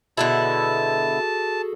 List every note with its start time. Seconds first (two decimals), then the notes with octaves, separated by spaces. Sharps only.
0.17 B2 D3 E4 F#4 G#4 A4 A5